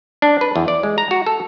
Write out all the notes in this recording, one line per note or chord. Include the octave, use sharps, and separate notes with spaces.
D4
B4
E2
D5
G#3
A#5
F#4
A4